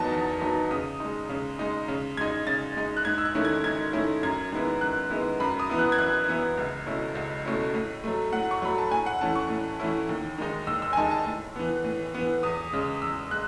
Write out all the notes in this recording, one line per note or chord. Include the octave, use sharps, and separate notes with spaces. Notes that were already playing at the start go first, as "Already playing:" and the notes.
Already playing: E2 D#3 F#3 B3 D#4 A5
E2
D#3 F#3 B3 D#4
C#3 D#6
G#3 D#4
C#3
G#3 D#4
C#3
G#3 D#4 G#6
C#3 A6
G#3 D#4
F#6
G#2 G#6
E6
F#6
D#3 A3 C#4 E4
G#6
G#2 G#6
D#3 A3 C#4 E4
F#2 G#6
D#3 G#3 B3 E4
F#2 F#6
D#3 G#3 B3 E4
F#2 B5
D#6
E3 B3 E4
F#6
G#6
F#2 F#6
E3 B3 E4
C#2
B2 A3 C#4 E4
C#2
B2 A3 C#4 E4
A2
F#3 A3
A2 F#5
C#6
F#3 A3 B5
A5
A2 G#5
F#5
E3 A3 C#4 E4 A5
C#6
A2
E3 A3 C#4 E4
D#2
D#3 G#3 D#4
D#2 E6
E6
G#5
D#3 G#3 D#4 A5
A5
A2
E3 B3
A2
E3 B3
E2 D#6
C#3 G#3
E2 E6
G#3 F#6